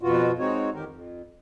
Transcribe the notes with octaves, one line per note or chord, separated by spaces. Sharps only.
F2 B2 B3 F4 F#4
G#3 C4 D#4 F#4 C#5
F2 D#3 G4 A#4
F2